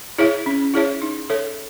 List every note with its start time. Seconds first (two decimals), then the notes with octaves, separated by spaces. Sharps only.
0.18 E4 G#4 C#5 E5
0.46 C#4
0.74 E4 G#4 C#5 E5
1.02 D#4
1.30 A4 C#5 E5